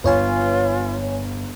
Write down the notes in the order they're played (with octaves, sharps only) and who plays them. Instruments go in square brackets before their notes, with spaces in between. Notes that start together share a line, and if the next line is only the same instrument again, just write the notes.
[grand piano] G1 [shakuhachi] F4 [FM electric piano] B4 C#5 G#5